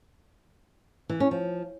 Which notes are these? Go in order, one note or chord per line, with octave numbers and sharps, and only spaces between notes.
E3
C#4
F3